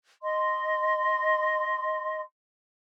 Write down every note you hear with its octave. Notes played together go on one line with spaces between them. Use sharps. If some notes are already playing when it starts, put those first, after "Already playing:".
D#5 C6